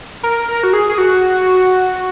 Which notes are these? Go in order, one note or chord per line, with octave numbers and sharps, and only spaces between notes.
A#4
A#4
F#4
G#4
G#4
F#4